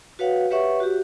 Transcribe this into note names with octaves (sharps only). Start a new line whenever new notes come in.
F#4 B4 C#5 F5 F#5
G4 B4 C#5 E5 F#5 C#6
F#4 G4